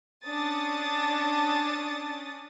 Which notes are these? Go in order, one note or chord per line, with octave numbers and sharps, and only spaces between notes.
C#4 D4 D#6 A6